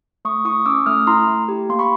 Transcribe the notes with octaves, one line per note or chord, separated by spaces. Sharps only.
A3 C#6 D#6
E4 C#6 D#6
C#4 D6 E6
A3 D#6 F6
E4 A#5 C6
A3
G4
A#3 C6
B5 C#6